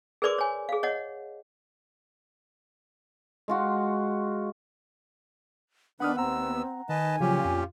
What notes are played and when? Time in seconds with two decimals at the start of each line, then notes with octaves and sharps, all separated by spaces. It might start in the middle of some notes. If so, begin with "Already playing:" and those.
0.22 G#4 A#4 B4 D5 C6 D6
0.38 C#5 G#5
0.69 G#4 F5
0.83 C#5 D#5 F#5
3.48 G#3 F4 F#4
6.00 D#3 B3 D4 B4 F#5 B5 D#6 F6
6.17 D#2 C4 F#5 A#5 E6
6.89 D#3 B4 D#5 G#5 A5
7.20 A#2 C#3 F3 F#3 C#4 F4 G4
7.45 F2